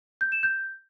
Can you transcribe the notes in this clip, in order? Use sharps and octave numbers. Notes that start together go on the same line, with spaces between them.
G6
E7
G6